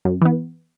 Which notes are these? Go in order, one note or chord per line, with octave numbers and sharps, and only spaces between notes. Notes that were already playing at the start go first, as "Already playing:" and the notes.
F#2
E3 B3